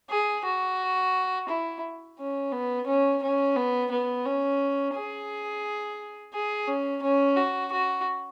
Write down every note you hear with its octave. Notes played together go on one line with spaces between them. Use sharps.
G#4
F#4
E4
C#4
B3
C#4
C#4
B3
B3
C#4
G#4
G#4
C#4
C#4
F#4
F#4